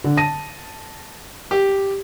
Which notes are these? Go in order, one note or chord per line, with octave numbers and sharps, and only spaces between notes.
D3
A5 A#6 D#7
G4